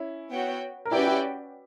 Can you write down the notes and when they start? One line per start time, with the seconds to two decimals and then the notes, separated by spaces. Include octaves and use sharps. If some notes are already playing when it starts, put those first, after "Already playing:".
Already playing: C#4 E4
0.31 B3 F#4 C#5 G5
0.85 A#4
0.91 C#4 E4 F#4 G4 B4 D5 G5
1.07 E4 G4